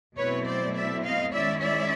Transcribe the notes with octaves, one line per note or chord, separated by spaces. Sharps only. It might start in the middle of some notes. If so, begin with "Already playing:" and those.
B2 F#3 A3 C4 E4 B4 C#5
C5 D5
D5 E5
D#5 F5
D#3 G#3 C#4 E4 D5 E5
D5 E5